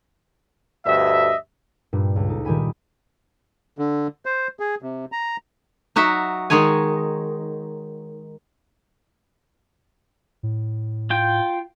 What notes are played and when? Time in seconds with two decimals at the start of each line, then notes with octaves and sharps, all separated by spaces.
0.86 D2 G2 D#5 E5
1.93 G2 A#2 G3
2.16 C#2
2.29 D#4 A4
2.45 A#2 D#3 G3 G4 G#5 B5
3.78 D3
4.26 C5
4.60 G#4
4.82 C3
5.12 A#5
5.96 F#3 D#4 F#4 E5
6.50 D#3 G#3 D#4 C#5 G#5
10.43 A2
11.10 F4 G5